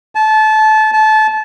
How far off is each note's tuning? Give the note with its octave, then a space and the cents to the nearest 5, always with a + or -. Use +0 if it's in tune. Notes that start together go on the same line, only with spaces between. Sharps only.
A5 -25
A5 -25